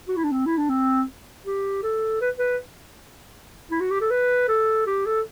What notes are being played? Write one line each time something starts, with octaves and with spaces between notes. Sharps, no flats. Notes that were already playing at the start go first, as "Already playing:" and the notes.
F#4
E4
D4
C4
E4
D4
C4
G4
A4
B4
B4
E4
F#4
G4
A4
B4
A4
G4
A4